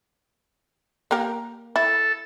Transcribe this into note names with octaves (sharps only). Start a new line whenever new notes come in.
A#3 G4 A#4
E4 A4